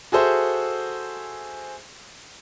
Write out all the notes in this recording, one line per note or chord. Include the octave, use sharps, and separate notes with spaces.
F#4 G#4 A4 C5 E5